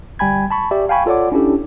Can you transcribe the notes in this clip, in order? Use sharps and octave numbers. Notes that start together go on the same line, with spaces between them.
G1 G3 G5 G#5 B5 G#6
A5 B5 C#6
G4 D5 E5
F5 G5 G#5 B5 C#6
F4 A4 C#5 D5 F#5 D6
C#4 D4 E4 G4 A4